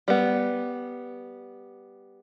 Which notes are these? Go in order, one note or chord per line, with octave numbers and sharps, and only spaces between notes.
G3 B3